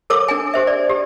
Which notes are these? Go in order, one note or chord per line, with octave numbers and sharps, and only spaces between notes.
A4 A#4 C#5 D6
D4 G#5
G4 C5 E5
D5
G4